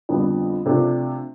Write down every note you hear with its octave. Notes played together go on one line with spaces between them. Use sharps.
F2 D3 G3 B3
C3 F3 A3 D4 A4